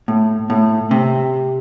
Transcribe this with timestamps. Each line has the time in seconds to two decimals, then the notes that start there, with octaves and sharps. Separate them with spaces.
0.08 A2
0.50 A2
0.91 C3